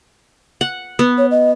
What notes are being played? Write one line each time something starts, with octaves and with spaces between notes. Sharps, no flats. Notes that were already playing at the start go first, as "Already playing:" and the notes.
F#5
B3
C#5
D#5